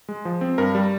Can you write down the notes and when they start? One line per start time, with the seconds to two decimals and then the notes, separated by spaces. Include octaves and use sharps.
0.09 G#3
0.25 F3
0.41 C4
0.58 G2 A#4
0.75 G3